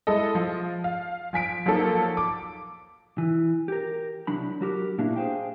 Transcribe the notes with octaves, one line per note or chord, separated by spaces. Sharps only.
G#3 E4 A4 D#5
F3
F5
F3 G#5 B6 D7
F3 F#3 A#3 D#4 A4
D6
E3
G4 A#4
C2 F#3 D4 B5
F#3 F#4 G4 A#4
A#2 A#3 D4 E4 F#4
G#4 B4 C5 F5 G5